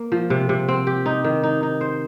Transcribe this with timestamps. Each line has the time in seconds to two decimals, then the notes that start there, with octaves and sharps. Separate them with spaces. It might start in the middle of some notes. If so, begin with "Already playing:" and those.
Already playing: A#3
0.12 F3
0.30 C3
0.49 C3
0.68 C4
0.87 G4
1.06 D#4
1.24 D#3
1.43 D#4
1.63 D#4
1.81 C5